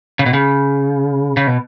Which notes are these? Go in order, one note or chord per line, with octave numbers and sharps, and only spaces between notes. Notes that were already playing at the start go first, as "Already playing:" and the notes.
C#3
B2
C#3
C#3
B2